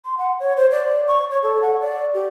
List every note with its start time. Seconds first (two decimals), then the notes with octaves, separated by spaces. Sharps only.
0.05 C6
0.18 F#5
0.40 C#5
0.57 C5
0.71 D5
1.08 C#6
1.31 C#5
1.43 A4
1.62 F#5
1.80 D5
2.14 G4